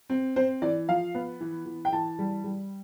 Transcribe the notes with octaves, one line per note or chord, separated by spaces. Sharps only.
C4
C4 C5
E3 D5
F3 F5
B3
E3
E3
G5
E3 A5
G3
G3